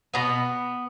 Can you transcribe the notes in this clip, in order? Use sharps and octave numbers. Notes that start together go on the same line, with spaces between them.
B2 B3